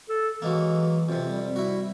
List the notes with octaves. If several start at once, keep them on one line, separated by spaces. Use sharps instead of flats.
A4
E3 F#3 G#3 A#3
F2 C3
G3
E4 F#4